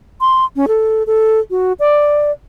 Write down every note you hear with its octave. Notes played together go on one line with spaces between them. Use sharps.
C6
C#4
A4
A4
F#4
D5